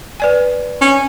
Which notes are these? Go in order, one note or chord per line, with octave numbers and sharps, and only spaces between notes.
B4 D5 G#5
C#4